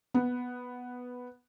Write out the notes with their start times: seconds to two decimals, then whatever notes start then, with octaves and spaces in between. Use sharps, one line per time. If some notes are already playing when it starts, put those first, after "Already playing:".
0.14 B3